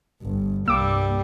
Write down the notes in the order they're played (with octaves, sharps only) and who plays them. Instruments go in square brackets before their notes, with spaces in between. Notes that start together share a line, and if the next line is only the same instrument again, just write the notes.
[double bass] G1 G2
[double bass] C2 G2 [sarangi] G3 [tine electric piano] A#3 [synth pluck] D6 E6